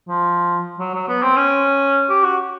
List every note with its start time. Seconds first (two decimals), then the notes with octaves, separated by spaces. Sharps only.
0.08 F3
0.79 F#3
0.94 F#3
1.08 B3
1.23 C4
1.37 C#4
2.09 G4
2.23 F#4